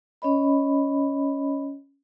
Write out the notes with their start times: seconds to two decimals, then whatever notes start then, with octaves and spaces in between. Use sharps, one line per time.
0.22 C#4 C#5 D#5 B5